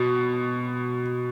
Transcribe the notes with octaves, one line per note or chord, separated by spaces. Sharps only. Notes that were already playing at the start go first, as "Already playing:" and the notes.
Already playing: B2